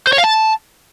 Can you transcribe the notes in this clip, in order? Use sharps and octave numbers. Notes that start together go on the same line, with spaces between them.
C5
C#5
F5
A5